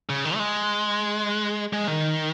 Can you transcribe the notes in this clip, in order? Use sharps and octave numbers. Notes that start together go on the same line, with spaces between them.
C#3
D#3
A3
G#3
G#3
D#3